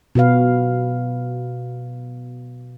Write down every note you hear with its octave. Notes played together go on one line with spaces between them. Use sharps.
B2 F#4 B4 F5